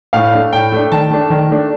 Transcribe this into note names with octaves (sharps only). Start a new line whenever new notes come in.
A2 F5
A3 D4
A2 G5
A3 D4
D#3 A5
A3 D4
D#3
A3 D4